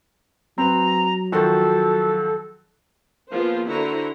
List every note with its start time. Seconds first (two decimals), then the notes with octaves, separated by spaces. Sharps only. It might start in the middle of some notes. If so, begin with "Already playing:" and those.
0.58 F#3 C4 B4 A#5
1.32 D#3 F3 F#4 A4
3.31 F3 A#3 B3 F4 G#4 C5
3.68 D3 E4 F#4 C5 A#5